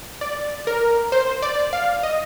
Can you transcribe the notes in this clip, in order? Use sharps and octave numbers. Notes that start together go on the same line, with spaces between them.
D5
A#4
C5
D5
F5
D#5